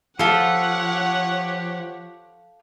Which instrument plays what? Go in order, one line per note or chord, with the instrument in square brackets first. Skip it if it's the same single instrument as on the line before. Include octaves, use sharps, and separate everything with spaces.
[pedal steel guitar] F3 [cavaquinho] F4 A4 [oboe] G4 [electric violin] C#5 F#5